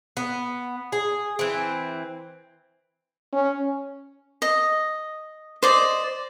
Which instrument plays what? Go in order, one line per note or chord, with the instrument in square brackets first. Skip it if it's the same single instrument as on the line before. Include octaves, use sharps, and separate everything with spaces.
[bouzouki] B3
G#4
E3 C4
[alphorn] C#4
[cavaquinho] D#5
C5 D5 D#5